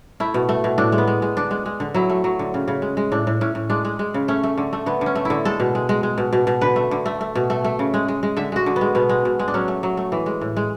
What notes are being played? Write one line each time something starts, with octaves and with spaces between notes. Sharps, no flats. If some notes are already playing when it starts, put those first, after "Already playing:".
A3 E4
B2
A3
B2
A2 D4
G#3
B3
G#3
G#3
D3 D4
G#3
G#3
D3
F#3 E4
A3
F#3
D3
C#3
C#3
G#3
G#3
A2 D4
A2
A2 C#4
A2
G#3 D4
G#3
G#3
C#3
A3 C#4
A3
D3
A3
D3 B3
D3
C#4
A3
D3 E4
G#3 A4
B2
G#3
G#3
G#3
B2
B2
B2
D3 B4
A3
D3
A3
A3
B2
A3
A3
C#3
G#3
G#3
G#3
D3 E5
G#3 F#4
D3
B3
G#3
B2 B3
G#3
B2
G#3
D4
F#3 C#4
A3
F#3
A3
E3
G#3
A2
G#3